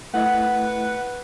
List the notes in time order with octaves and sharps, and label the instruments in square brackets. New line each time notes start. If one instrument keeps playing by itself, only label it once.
[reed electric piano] A3 E4 D#5 [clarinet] B4 [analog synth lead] F#5